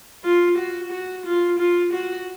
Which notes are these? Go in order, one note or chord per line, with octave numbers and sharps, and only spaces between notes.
F4
F#4
F#4
F4
F4
F#4